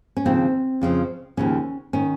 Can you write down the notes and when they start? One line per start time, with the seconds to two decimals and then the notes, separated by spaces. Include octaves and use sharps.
0.17 C#4
0.25 D#2 C#3 F3 C4
0.81 F2 C#3 F3
1.37 D#2 C#3 F3 C#4
1.93 D#3 C#4